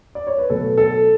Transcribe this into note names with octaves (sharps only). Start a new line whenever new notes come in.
D5
C#5
B4
B2 F#3 A3 A4
A4